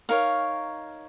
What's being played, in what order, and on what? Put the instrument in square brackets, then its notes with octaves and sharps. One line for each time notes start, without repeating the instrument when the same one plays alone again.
[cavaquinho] D#4 A#4 C#5 F5